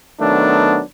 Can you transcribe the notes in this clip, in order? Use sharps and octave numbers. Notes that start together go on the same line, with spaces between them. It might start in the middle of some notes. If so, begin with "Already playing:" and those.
D#3 F#3 A3 B3 D4